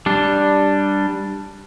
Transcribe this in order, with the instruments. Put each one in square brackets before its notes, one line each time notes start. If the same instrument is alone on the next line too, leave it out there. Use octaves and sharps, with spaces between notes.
[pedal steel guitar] G3 D4